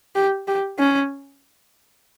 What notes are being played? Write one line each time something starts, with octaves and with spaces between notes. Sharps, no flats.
G4
G4
C#4